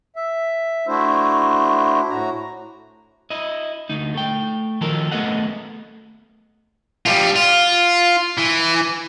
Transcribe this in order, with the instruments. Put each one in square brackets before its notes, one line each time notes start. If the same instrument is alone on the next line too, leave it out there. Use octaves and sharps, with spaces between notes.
[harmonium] E5
A3 D4 E4 F#4 C5
A2 F#4 A#5
[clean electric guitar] E4 D#5
D2 D#4
A3 G5
D#3 F3 F#3 D#4 A4 A#4
A3 B3 A4 D#5 F#5
[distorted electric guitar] G3 F4
F4
E3